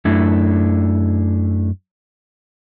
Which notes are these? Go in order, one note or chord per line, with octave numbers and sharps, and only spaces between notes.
F#2 A3 D4 E4